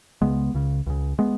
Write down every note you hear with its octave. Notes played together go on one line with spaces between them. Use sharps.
C#2 C#3 G#3 B3
C#2 C#3
C#2 C#3
G#3 B3